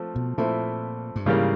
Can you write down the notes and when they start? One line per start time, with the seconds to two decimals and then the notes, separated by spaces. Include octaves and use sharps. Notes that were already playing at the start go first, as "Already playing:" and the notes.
Already playing: F3 A3 C4
0.16 B2
0.38 A#2 F3 A3 C4 E4
1.16 G2
1.26 G#2 C#3 E3 G3 A#3